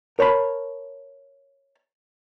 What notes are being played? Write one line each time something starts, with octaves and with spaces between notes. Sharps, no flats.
A#4 C#5 A5 B5